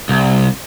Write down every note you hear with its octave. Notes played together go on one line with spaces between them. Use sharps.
C2